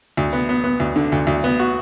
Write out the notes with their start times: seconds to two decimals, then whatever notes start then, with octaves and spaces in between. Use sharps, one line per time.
0.17 D2
0.33 B3
0.49 B3
0.64 B3
0.80 D2
0.96 D3
1.12 D2
1.27 D2
1.44 B3
1.59 F#4